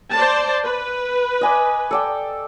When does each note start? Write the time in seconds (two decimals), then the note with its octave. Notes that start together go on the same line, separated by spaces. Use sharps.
0.12 C5 D5 A5
0.64 B4
1.41 D#5 G#5 D6
1.91 A4 D5 G5